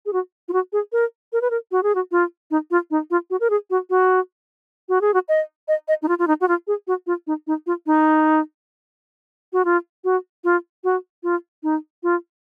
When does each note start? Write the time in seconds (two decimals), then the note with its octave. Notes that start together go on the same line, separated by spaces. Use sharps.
0.06 G#4
0.13 F#4
0.48 F4
0.53 F#4
0.73 G#4
0.92 A#4
1.33 A#4
1.42 B4
1.50 A#4
1.72 F#4
1.83 G#4
1.95 F#4
2.12 F4
2.51 D#4
2.71 F4
2.91 D#4
3.11 F4
3.30 F#4
3.40 A#4
3.50 G#4
3.70 F#4
3.90 F#4
4.89 F#4
5.01 G#4
5.14 F#4
5.29 D#5
5.68 D#5
5.88 D#5
6.02 D#4
6.08 F4
6.19 F4
6.27 D#4
6.41 F#4
6.48 F4
6.67 G#4
6.87 F#4
7.07 F4
7.27 D#4
7.47 D#4
7.67 F4
7.86 D#4
9.53 F#4
9.65 F4
10.04 F#4
10.44 F4
10.84 F#4
11.23 F4
11.63 D#4
12.03 F4